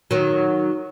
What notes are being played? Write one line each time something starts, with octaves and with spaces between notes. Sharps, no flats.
D#3 F#3